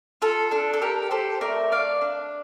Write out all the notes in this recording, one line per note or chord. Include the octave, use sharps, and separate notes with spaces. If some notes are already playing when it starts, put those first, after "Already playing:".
F4 A4
D4 A4
A4
G4 A#4
G4 A4 C5
A3 A#4 D5
D4 D5 F5
D4